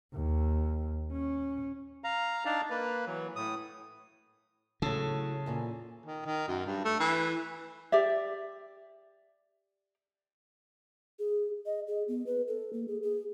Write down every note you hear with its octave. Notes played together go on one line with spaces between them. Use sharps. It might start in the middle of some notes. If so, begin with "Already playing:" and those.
D#2
C#4
F5 A#5
D4 D#4 D5 F5
A#3 B4
E3 F#3
A2 D#6
A2 C#3 F#3 A4
E2 A#2 C#4
D#3
D#3
F#2
G2
A3
E3
G4 D5 E5
G#4
D#5
G#4
B3
B4
A4
A#3
G#4
G#4